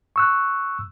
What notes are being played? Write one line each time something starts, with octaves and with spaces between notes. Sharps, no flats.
C#6 E6 F#6